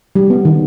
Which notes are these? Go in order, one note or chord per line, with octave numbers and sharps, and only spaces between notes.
G3
B3
D#3